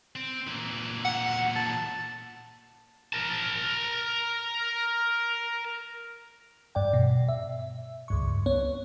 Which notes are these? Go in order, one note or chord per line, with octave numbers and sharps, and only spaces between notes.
C4
A#2 E3
F#5
A5
A#4 A5
G2 D5 G5
B2
E5
C#2 G2 C#6
B3 C#5